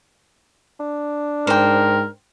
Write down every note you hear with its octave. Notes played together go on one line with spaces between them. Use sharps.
D4
G#2 A#4 C5 G5